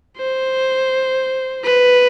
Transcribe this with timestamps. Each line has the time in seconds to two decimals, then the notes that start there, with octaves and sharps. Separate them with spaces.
0.17 C5
1.64 B4